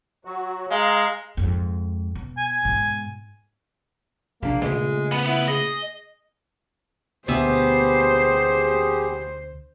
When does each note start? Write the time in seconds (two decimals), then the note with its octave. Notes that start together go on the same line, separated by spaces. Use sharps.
0.25 F#3 F#4
0.71 G#3 F5 A#5
1.37 F2 G#2
2.15 B2
2.38 G#5
2.65 G#2 B2
4.42 A#1 C3 A#3 D4
4.62 A#2 C#3 G#3 A3
5.12 B3
5.26 B3 E4
5.48 G#4 D#5
7.28 D2 B2 B3 G4 G#4 C5 E5